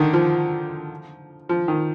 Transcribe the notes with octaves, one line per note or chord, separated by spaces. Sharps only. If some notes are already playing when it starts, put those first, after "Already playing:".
Already playing: D3 D#3
F3
F3
D#3